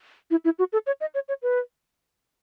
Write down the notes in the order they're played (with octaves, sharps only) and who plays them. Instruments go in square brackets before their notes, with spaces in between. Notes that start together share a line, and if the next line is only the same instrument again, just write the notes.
[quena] E4
E4
F#4
A4
C#5
D#5
C#5
C#5
B4